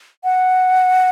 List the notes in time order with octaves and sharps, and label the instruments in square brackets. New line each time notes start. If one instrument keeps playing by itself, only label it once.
[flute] F#5